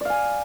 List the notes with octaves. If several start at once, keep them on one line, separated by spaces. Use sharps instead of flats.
D5 F5 G#5